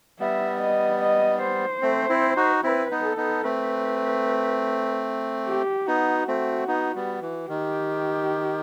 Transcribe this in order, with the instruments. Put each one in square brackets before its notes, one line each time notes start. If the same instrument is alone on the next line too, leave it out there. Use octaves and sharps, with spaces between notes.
[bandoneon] G3 B3 [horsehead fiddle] E5
[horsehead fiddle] D#5
D#5
C5
[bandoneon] A3 C4
C4 E4
D#4 F#4
[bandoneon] C4 E4 [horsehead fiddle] B4
[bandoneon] B3 D#4
[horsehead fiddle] A4
[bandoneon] B3 D#4
[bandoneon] A3 C4 [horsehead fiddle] B4
[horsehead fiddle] G4
[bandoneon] B3 D#4 [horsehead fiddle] F#4
[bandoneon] A3 C4
B3 D#4
G3 B3
E3
[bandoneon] D#3 [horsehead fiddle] G4